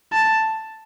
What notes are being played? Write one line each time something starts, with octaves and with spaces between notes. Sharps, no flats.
A5